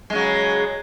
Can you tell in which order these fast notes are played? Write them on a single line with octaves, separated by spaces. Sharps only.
G#3 C#3 F#3